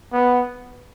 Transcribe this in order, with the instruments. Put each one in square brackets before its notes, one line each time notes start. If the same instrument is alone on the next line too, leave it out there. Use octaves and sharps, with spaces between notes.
[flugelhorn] B3